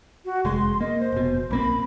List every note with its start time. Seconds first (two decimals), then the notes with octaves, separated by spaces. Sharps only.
0.25 F#4
0.45 F1 G#3 C6
0.81 A#3 D#5
1.00 C5
1.13 F1 B2
1.51 B1 A#3 C4 B5